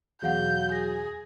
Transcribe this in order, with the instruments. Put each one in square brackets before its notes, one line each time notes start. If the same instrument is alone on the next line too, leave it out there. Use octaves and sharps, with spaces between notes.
[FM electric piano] E2 B2 [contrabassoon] F#3 [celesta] G#4 F5 F#5 [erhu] G6
[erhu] G#4 [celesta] A#6